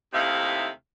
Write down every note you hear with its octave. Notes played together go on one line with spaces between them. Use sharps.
D#2 C3 A3 D#4 E4 F5